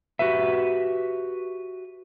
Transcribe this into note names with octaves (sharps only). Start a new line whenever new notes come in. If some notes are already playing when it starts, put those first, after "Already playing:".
F#4 G4 B4 E5